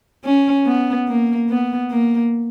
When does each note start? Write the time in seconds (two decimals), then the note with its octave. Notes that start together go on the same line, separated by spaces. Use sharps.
0.25 C#4
0.66 B3
1.08 A#3
1.49 B3
1.90 A#3